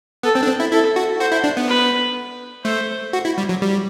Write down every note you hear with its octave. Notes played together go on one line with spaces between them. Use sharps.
B3 A4
C4
D4
C4
E4
E4 A4
F#4
F#4 C5
E4
D4
B3
B4
A3 C5
F#4
E4
G3
F#3
G3